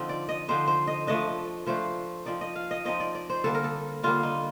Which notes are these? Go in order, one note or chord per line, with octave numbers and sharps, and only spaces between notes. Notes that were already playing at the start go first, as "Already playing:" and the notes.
Already playing: D3 F3 C4 D#4
D5
D#5
D3 F3 C4 D#4 C5
C5
D#5
F3 A3 D4 D#5
F3 A3 D4 C5
F3 C4 D#4 D5
D#5
F5
D#5
F3 C4 D#4 D#5
D5
D5
C5
D3 G3 A#3 A4
A#4
A4
D3 G3 A#3 F4
D#4